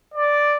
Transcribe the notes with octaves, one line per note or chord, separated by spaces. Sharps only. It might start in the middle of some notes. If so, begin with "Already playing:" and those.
D5